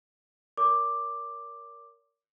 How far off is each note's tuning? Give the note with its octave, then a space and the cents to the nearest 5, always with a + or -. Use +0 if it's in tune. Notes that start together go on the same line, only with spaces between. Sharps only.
A#4 +0 C#5 +45 D6 +5